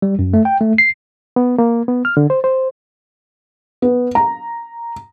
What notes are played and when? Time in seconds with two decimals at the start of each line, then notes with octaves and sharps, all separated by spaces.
0.02 G3
0.19 F#2
0.34 A3
0.45 G5
0.61 A3
0.78 C7
1.36 B3
1.58 A#3
1.88 B3
2.05 F6
2.17 D3
2.30 C5
2.44 C5
3.82 B3
4.15 A#5